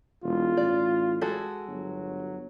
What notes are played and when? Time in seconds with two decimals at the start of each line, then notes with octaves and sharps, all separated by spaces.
0.24 E1 F4
0.57 A1 D5
1.21 G#3 F#4 A4
1.68 G1 F#3